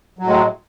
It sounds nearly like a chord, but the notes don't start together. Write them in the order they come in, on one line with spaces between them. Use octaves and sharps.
F#3 A2 G#3